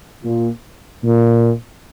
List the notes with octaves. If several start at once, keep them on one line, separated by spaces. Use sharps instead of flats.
A#2
A#2